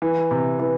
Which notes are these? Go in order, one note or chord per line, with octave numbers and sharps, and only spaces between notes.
E3
C3
E3